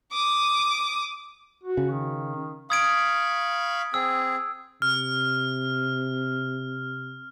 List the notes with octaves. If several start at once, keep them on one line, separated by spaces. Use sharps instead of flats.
D6 D#6
F#4
C#3
D#3
F5 B5 C#6 D#6 G#6 D7
C4 G#4 E6
C3 F6